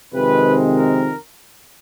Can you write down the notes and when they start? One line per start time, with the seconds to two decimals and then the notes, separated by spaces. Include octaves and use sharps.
0.13 F2 C3 D#3 G#3 C4 B4
0.76 A#4